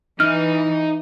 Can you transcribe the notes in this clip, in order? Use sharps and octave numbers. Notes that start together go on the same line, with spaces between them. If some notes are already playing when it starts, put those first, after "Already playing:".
E3 D#4 F6